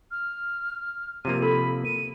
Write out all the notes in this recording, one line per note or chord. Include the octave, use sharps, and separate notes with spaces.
F6
C3 F3 A#3 D#7
A4 B5
D#7